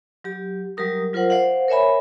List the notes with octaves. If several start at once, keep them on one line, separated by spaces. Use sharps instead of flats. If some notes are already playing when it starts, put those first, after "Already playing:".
F#3 G4
F#3 G3 G4 A#4 D#6
F#3 F4 A#4 C5 F#5
C5 D5 F5 F#5
A#4 C#5 E5 G#5 B5